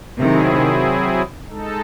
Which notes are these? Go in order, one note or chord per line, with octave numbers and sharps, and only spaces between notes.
C3 D#3 F#3 C4 E4 G#4
G#3 D#4 A4